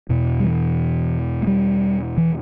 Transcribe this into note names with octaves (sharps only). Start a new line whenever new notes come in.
E2 B2
G3
E3
A3
G3
E3